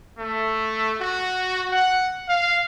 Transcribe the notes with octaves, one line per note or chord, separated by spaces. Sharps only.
A3
F#4
F#5
F5